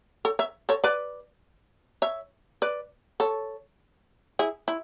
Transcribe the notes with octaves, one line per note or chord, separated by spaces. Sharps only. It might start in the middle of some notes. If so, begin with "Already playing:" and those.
A4 C#5
C#5 E5
A4 C#5
B4 D5
C#5 E5
B4 D5
A4 C#5
E4 G#4
E4